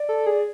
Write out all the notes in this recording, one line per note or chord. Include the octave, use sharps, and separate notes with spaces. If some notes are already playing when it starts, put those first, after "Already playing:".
Already playing: D5
A4
G#4